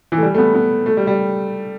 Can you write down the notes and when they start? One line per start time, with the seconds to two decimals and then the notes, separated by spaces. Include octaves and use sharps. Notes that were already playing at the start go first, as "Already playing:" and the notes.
0.12 E3
0.18 A3
0.23 G3
0.34 A3
0.38 B3
0.54 B3
0.86 A3
0.97 G3
1.07 G3